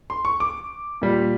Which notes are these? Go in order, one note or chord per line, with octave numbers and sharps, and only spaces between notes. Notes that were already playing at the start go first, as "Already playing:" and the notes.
C6
C#6
D6
A#2 G3